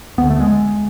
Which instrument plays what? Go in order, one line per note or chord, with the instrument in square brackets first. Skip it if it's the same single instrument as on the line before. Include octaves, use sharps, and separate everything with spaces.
[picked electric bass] D2 D3 B3
A3
G#3